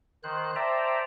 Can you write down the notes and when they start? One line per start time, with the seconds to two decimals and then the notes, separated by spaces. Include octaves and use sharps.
0.24 D#3 C5 F#6
0.56 C5 D5 E5 G5 A5 A#5